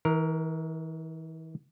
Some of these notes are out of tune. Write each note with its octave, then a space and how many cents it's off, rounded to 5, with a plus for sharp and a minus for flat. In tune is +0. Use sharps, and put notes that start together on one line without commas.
E3 -40 A#4 +0